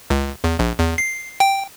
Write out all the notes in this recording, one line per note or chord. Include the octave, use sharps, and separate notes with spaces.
C#2
E2
A#1
E2
C7
G5